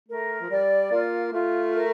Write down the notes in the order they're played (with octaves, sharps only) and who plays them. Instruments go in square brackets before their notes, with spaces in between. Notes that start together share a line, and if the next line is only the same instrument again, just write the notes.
[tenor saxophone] A3 [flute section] A#4
[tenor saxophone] F3
[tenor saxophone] G3 [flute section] D5
[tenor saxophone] A#3 [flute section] F4
[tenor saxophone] A3 [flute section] F4
[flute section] A#4